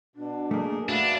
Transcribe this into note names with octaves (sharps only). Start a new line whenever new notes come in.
B2 D4
A3 A#3 G#4 A#4
D4 F#4 B4 E5 F5